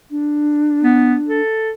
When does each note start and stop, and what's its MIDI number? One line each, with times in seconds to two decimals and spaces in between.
0.10 1.40 62
0.83 1.16 59
1.28 1.71 69